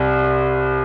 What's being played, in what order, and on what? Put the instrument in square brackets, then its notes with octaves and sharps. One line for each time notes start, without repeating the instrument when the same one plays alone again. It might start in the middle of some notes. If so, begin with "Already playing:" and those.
Already playing: [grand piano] C2 C3